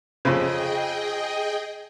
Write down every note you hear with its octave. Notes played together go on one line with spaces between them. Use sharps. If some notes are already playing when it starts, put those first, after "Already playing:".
F2 C#3 G#4 D#5 G5